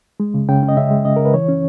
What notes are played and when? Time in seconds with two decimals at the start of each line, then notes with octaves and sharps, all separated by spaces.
0.20 G#3
0.34 C#3
0.49 C#3 G5
0.63 C#4
0.68 D#5
0.77 C#3 E5
0.91 G#3
1.05 C#3 D#5
1.16 C#3 A#4
1.25 B4
1.34 E3 C#5
1.49 C#4